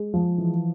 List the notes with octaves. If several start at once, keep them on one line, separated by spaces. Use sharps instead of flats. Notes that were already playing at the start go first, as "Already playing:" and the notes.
Already playing: G#3
F3
E3